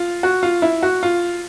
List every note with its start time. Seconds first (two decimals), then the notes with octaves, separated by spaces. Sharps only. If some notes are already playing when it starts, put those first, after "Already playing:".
Already playing: F4
0.23 F#4
0.43 F4
0.62 E4
0.83 F#4
1.03 F4